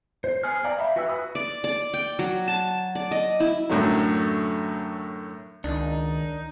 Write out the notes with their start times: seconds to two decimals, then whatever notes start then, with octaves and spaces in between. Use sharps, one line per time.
0.24 C5
0.43 B3 G#4 G#5 F6
0.64 D5 F5 G5 A#5 D6
0.79 E5 F5 G5 B5
0.96 F#4 B4 E5 G#5 E6
1.08 E4 F#4 B4 B5 D#6
1.35 D5
1.64 D5
1.94 G5
2.19 F#3
2.48 A5
2.95 D5
3.11 D#5
3.40 E4
3.70 F#2 A2 D3 F#3
5.64 C#2 D#3 D4 D#4